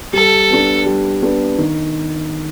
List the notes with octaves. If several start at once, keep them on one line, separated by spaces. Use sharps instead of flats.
G3 A4
B3 D4
G3
B3 D4
D#3